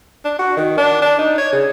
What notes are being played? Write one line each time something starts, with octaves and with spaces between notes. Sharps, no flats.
D4
F#4
D#3
D4
D4
D#4
C#5
C#3